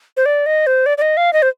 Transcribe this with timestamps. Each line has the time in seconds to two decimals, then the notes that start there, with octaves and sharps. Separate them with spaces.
0.17 C5
0.26 D5
0.46 D#5
0.67 C5
0.86 D5
0.98 D5
1.02 D#5
1.17 F5
1.33 D#5
1.42 C5